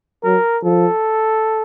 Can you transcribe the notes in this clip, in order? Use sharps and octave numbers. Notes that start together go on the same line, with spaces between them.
F#3 A#4
F3 A4